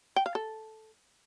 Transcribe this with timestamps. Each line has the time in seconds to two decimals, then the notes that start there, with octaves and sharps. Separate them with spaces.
0.16 G5
0.26 F5
0.35 A4